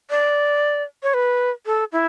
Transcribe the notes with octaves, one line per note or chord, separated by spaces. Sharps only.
D5
C#5
B4
A4
E4